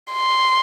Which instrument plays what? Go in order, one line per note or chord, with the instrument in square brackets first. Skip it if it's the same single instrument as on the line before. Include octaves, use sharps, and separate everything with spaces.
[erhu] C6